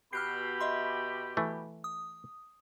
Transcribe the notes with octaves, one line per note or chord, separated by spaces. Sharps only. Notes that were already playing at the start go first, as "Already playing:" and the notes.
B2 G4 B5 F6 F#6 C7
D#5 E5 C6
E3 A3
D#6